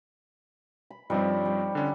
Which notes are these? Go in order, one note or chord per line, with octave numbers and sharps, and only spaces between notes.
B5
G2 F3 G3 C4 D#4 C#5
G3
D3 C#4 D4